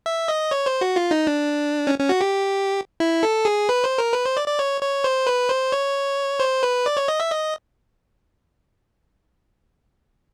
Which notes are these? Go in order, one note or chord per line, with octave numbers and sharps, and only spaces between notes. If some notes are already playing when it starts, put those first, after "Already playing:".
E5
D#5
C#5
C5
F#4
F4
D#4
D4
C#4
C#4
F#4
G4
E4
A4
G#4
B4
C5
A#4
B4
C5
D5
D5
C#5
C#5
C5
B4
C5
C#5
C5
B4
D5
C#5
D#5
E5
D#5